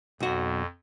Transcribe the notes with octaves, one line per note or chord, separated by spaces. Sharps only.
B1 F2 F#4